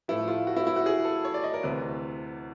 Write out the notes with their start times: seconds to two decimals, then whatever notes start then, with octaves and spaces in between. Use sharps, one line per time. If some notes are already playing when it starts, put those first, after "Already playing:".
0.08 A2 F3 A3 E4
0.28 F4
0.47 F#4
0.56 E4
0.67 E4
0.76 F#4
0.86 G#4
1.05 A4
1.25 C#5
1.34 D5
1.44 D#5
1.54 A#4
1.63 D2 C3 E3 B4